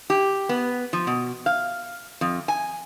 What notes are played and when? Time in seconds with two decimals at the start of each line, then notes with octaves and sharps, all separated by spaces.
0.10 G4
0.49 B3
0.93 F3
1.07 B2
1.46 F5
2.21 F2
2.48 G#5